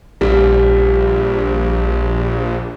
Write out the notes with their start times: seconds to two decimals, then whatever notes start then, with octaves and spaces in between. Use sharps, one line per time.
0.21 A#1 G3